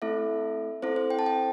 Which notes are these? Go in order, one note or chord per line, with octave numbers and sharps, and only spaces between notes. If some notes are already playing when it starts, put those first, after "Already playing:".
A3 C4 E4 A4 E5
C4 E4 A4 C5
C5
G5
A5
G5